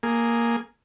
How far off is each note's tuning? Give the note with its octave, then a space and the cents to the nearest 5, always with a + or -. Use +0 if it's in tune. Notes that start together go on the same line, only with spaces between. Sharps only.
A#3 +0 G#4 +0